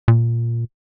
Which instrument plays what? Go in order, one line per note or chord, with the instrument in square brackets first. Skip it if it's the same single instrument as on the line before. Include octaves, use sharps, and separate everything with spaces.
[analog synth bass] A#2